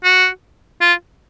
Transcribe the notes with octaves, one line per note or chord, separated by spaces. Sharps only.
F#4
F4